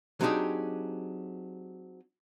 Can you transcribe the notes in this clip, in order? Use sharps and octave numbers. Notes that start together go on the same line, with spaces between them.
F#3 C4 D4 D#4 G4 G#4